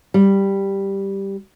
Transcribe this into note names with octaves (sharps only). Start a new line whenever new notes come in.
G3